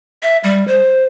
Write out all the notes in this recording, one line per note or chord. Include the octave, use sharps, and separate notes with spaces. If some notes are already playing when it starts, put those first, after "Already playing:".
E5
G3
C5